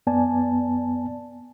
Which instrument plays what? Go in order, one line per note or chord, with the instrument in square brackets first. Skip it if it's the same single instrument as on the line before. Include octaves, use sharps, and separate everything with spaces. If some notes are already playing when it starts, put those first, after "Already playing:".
[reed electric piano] F#2 B3 D5 G#5 A5